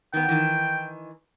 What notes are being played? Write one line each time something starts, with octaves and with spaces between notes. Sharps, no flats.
D#3 B3 G5
D#3 E3